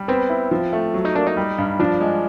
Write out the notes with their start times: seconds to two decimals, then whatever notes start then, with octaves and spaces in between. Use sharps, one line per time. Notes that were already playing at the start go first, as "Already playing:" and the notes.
Already playing: G3
0.08 B3 C4
0.29 E4
0.51 F3
0.73 A3
0.94 F#3
1.05 D#4
1.15 A#3 D4
1.26 D#4
1.37 G3
1.58 G2
1.79 F3 D4
2.01 G#3